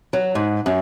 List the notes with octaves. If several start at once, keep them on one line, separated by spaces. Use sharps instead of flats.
F#3
G#2
F#2